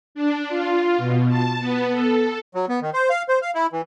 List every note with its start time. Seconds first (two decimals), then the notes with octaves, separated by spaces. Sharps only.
0.15 D4
0.49 F4
0.98 B2
1.29 A5
1.60 B3
1.92 A4
2.55 F#3
2.69 B3
2.82 D#3
2.94 C5
3.10 F5
3.29 C5
3.42 F5
3.54 E4
3.73 E3